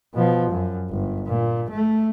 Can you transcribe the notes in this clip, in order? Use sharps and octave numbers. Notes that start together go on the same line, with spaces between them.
B2 F3
F#2
G1
A#2
A3